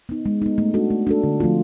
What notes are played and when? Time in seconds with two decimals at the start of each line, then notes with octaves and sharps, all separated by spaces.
0.09 B3 D#4
0.26 G#3
0.42 B3 D#4
0.58 A3
0.74 D4 F#4 A4
0.91 A3
1.07 D4 F#4 A4
1.24 D3
1.40 F3 A3 C4 F4